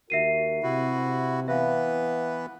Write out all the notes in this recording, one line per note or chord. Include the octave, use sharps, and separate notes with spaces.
D#2 F#4 A#4 E5 C7 D#7
C3 E4 F#4
E3 B3 B4 E5 F5